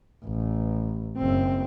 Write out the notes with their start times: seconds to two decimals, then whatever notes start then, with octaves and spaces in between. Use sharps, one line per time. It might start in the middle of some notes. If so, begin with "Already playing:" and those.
0.25 A1
1.17 F#1 C4